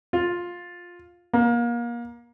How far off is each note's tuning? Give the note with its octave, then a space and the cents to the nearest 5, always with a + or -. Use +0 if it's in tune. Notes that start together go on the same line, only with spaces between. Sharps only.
F4 +10
A#3 +30